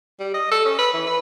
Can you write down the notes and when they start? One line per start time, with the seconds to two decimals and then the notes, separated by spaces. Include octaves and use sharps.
0.20 G3
0.34 D#5
0.51 A4
0.66 C#4
0.79 B4
0.94 E3
1.07 B4